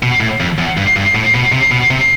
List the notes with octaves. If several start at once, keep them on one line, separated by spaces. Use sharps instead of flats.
B2
A2
F2
E2
G2
G2
A2
B2
C3
B2
C3